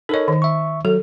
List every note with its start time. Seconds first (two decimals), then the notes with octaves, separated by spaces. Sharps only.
0.09 D#4 A4 A#4 C#5 D#5
0.28 D#3
0.42 E5 C#6
0.85 F#3 A4